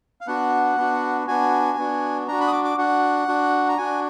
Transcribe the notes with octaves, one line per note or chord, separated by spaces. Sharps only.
F5
B3 D4 F#4 F#5
B3 D4 F#4
B3 D4 F#4 G#5
B3 D4 F#4
D4 F#4 A#5
B5
D#6
D6
D6
D4 F#4 F#5
D4 F#4
A#5
D4 F#4 G#5